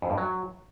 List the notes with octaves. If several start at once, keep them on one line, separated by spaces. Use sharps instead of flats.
F2
G2
F#3